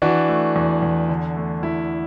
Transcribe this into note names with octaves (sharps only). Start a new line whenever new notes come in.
E3 D4 F#4
A3
E2
E2
D3
A3
E2 E4